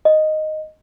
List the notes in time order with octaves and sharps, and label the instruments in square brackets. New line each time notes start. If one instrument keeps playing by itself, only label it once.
[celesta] D#5